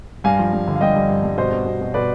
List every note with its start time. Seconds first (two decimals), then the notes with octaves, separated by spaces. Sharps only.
0.24 G2 F5 G#5
0.39 F3
0.53 G2
0.68 D3
0.76 F5
0.81 G2 D#5 G5
0.96 G2
1.09 G2
1.24 G2
1.37 B2 C5 D#5
1.52 B2
1.66 B2
1.81 B2
1.94 B2 B4 D5